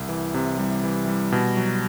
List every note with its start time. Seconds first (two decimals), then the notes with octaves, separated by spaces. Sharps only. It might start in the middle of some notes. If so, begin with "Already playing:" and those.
Already playing: C2
0.09 E3
0.34 C3
0.58 G3
0.84 E3
1.07 G3
1.32 B2
1.57 F#3